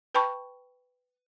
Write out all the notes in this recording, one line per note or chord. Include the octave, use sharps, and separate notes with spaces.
B4 G5 A5 B5 C#6